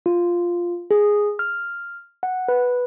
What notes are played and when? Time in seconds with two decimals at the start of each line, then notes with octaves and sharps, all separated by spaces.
0.06 F4
0.91 G#4
1.39 F6
2.23 F#5
2.48 B4